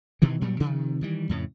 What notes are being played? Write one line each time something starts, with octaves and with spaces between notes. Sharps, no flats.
G2 B2 D#3 E3
G2 A#2 F#3 G3
C3 D#3 F3
D#3 E3 G3
F2 A2 C#3